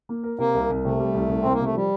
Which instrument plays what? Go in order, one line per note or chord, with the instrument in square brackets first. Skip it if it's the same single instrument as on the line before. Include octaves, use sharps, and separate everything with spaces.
[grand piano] A#3
A#4
[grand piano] C3 [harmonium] A#3
[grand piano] C2
C2
[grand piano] C3 [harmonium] A3
[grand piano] G3
C2
C2
[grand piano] C2 [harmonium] C4
[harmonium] A#3
[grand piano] C3 [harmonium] A3
[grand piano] F3 [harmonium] G3